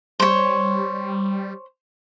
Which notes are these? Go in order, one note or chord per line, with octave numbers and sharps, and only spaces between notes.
G3 C5 C#5